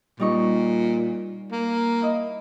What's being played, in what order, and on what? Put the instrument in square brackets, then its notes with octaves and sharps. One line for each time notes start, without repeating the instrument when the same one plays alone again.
[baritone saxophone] A#2 [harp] G3 D#4 C#6
[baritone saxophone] A#3
[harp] E4 D#5